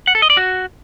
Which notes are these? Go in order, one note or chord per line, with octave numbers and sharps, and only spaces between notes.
F#5
A4
D#5
D5
F#4